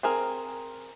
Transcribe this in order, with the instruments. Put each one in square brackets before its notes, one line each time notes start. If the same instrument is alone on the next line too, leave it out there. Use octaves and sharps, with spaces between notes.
[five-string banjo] C4 G#4 A#4